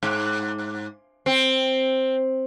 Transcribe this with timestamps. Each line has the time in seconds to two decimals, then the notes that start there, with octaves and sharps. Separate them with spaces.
0.03 G#2
1.26 C4